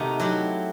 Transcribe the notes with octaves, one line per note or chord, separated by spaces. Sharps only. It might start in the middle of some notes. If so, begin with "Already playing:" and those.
Already playing: C3 D#3 A3 D#4 F#4
F#3 C4 E4 G4